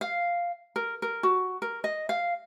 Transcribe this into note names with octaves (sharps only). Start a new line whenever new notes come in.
F5
A#4
A#4
F#4
A#4
D#5
F5